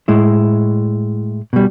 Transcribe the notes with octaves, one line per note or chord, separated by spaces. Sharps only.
A2 G#3 E4
B2 G3